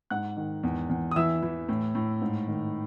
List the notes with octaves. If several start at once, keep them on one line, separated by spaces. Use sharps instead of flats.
G#2 F#5 F#6
D#3
E2
E2
D#6
E3 E5 E6
E3
A2
A2
G#2
D#3